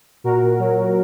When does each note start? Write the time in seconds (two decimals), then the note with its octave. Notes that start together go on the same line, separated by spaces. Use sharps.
0.24 A#2 F#4 A#4
0.42 A#2
0.59 F#3
0.77 A#2